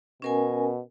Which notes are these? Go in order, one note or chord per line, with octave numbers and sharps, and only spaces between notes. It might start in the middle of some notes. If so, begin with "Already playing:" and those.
B2 C#4 A#4 G#5